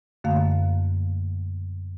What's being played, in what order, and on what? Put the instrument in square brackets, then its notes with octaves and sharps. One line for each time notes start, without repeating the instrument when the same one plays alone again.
[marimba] F#2 D3 A3 A#3 F5